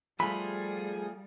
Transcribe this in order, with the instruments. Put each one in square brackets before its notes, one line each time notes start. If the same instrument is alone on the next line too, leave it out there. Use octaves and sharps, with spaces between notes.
[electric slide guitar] F3 A3 F4 [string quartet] G3 [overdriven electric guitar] G#4 [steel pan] B5